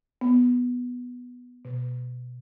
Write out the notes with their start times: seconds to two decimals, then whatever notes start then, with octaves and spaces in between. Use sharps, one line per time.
0.21 B3
1.65 B2